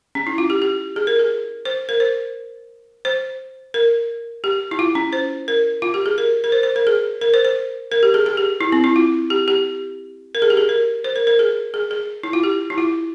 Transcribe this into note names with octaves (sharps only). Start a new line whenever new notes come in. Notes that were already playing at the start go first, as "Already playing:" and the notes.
C#4
E4
F4
G4
G4
G#4
A#4
G#4
C5
A#4
C5
C5
A#4
G4
E4
F4
C#4
C5
A#4
F4
G4
G#4
A#4
A#4
C5
C5
A#4
G#4
A#4
C5
C5
A#4
G4
G#4
G#4
G4
E4
C4
E4
F4
G4
G4
A#4
G#4
G4
G#4
A#4
C5
A#4
A#4
G#4
G#4
G#4
E4
F4
G4
E4
F4